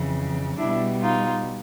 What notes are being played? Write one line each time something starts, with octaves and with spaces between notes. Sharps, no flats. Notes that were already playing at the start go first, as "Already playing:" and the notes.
Already playing: F2 C#3 E3
B2 G3 D4 E4
D#4 F4